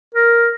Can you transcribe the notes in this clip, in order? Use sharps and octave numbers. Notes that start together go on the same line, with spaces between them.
A#4